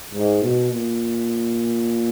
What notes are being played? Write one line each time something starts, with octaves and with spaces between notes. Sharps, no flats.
G#2
B2
A#2